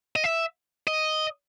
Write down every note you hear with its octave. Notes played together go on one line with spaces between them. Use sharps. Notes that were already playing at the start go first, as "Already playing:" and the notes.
D#5
E5
D#5